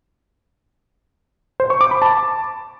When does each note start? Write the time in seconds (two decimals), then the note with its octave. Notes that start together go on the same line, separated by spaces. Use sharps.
1.60 C5
1.70 C#6
1.81 D6
1.91 B5
2.02 A5